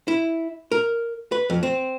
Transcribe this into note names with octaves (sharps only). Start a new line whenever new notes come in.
E4
A#4
B4
F2
C4